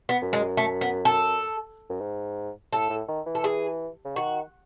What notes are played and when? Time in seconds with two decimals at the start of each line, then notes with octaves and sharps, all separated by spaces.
0.09 B3
0.22 F#2
0.33 G#3
0.57 A3
0.81 B3
1.05 A4
1.90 F#2
2.01 G#2
2.73 A2 A4
2.90 A2
3.08 D#3
3.26 E3
3.35 A4
3.44 G#4
4.05 C#3
4.16 D#3 F#4